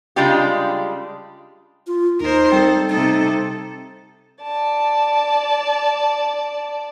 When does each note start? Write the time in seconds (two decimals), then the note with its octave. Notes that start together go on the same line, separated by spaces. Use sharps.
0.16 C#3 G3 G#3 D4 F4 G4
1.87 F4
2.20 D#2 D#4 A#4 C5
2.52 G3 C4 A4 G5
2.90 C3 D#4 A4
4.42 D5 A5